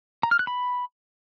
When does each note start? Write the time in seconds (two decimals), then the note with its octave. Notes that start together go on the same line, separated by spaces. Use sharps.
0.23 A#5
0.31 F6
0.39 F#6
0.47 B5